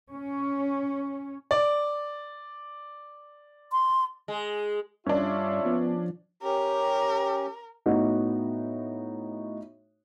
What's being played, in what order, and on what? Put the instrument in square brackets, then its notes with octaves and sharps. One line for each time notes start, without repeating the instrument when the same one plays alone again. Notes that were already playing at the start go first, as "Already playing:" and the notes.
[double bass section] C#4
[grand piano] D5
[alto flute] C6
[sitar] G#3
[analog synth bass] G2 [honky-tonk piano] C#4 D4 [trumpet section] F4 C#5 E5
[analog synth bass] F3 [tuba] B3
[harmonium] C#4 G4 [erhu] A#4
[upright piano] A2 B3 D#4 F#4